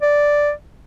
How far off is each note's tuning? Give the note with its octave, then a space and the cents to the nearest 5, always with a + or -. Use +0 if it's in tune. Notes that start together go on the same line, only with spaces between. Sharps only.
D5 +0